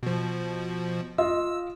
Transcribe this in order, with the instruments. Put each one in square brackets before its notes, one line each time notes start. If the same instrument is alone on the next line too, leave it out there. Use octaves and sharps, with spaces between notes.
[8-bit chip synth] B2 F3
[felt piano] F4 D#5 F5 [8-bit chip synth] E6